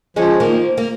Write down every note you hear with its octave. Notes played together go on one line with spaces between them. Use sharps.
F3 G#3 C#4
D#3 F3 A#3
A#3